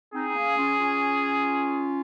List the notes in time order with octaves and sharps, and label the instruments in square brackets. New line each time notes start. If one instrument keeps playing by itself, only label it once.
[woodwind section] C4 D#4 [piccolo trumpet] G#4
[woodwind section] D#4
A#3 C#4
C#4 F4
C#4 F4